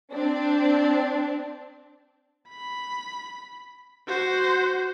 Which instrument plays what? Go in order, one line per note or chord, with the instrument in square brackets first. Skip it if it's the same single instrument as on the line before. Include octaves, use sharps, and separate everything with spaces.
[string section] C4 D4
[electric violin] B5
F#4 C5